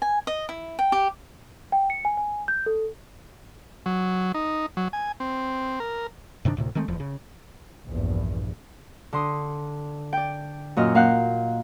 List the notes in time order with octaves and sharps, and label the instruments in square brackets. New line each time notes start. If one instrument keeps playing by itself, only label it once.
[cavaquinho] G#5
D#5
E4
G5
G4
[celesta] G5
C#7
G#5
G#5
G6
A4
[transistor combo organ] F#3
D#4
F#3
G#5
C4
A#4
[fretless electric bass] G2 C3 D#3 D4
D2 A2 C3
D#3 G#3 A3 C4
D1 E2 F3
C#3
[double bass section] A#1 E2 G2
[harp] D3 C6 D#6
D5 G5
F#2 A#2 D#5 F6
A#3 F5 F#5 F#6 G6